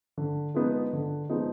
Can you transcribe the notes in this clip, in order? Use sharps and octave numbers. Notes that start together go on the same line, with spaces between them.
D3
F3 G#3 B3 D#4
D3
F3 G#3 B3 D#4